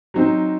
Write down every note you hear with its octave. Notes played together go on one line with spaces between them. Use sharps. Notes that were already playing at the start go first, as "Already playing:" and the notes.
F#3 C4 D#4